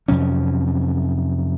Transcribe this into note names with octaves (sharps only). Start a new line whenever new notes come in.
F2 C3 F#3 C#4